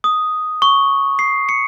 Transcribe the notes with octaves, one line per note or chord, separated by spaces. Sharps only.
D#6
C#6
C7
C#7